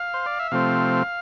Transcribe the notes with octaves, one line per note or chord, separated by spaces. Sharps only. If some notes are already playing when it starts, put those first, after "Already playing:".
Already playing: F5
C5
D5
E5
C3 F3 A3 C4 F5